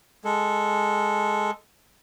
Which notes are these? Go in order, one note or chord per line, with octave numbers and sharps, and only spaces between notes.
G#3 A4